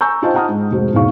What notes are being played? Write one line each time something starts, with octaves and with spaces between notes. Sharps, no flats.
G#5 A#5 C#6 E6 G6
D#4 F4 C5 D#5 G5 A5
D#5 F#5 A5 A#5 D#6 F6
G#2
F1 G#3 F#4 C5
F1 B1 E2 D#4 F5 C#6